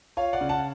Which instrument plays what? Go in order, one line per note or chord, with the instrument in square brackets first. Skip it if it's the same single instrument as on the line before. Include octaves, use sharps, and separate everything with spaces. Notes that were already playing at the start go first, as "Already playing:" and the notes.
[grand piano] F4 C#5 F5
D5 F#5
C#3
F#5 A5